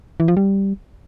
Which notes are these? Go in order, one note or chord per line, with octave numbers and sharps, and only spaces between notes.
E3
F3
G3